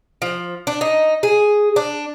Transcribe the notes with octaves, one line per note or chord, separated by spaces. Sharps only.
F3
D4
D#4
G#4
D4